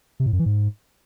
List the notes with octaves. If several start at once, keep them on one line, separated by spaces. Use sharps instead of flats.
C3
A2
F#2
E3
G#2